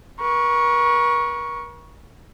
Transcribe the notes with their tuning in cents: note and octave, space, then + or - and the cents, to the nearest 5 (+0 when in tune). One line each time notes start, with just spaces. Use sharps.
A#4 +45 C#6 +0